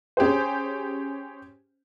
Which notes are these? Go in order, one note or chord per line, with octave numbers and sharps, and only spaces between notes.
C#4 G4 G#4 C5